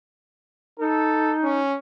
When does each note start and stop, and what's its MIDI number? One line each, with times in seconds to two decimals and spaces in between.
0.80 1.61 63
0.80 1.36 69
1.43 1.77 61